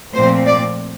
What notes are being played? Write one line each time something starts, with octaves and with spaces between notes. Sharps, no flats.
A#2 F3 A3 C4 C5
D5